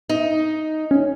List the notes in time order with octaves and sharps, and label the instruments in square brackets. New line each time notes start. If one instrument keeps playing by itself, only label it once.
[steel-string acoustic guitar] D#4
[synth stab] C#4